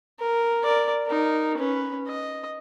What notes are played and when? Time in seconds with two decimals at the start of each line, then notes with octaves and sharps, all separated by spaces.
0.19 A#4
0.63 A#4 D5
1.07 D#4 A#4
1.58 C#4 B4
2.07 D#5